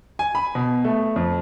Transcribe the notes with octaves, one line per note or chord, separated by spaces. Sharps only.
G#5
B5
B2
A3
F2